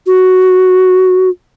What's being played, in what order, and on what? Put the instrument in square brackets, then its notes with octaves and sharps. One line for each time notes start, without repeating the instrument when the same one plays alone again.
[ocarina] F#4